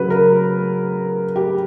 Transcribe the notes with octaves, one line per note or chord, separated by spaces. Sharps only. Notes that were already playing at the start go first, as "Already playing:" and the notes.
Already playing: C#3 F#3 B4
A#4
G4